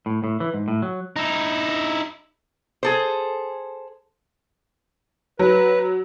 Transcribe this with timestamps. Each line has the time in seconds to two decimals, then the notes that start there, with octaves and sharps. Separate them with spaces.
0.06 A2
0.24 A2
0.40 E3
0.54 G#2
0.68 A2
0.82 F#3
1.16 D#4 E4
2.83 G#4 A4 C5
5.39 F#3 B4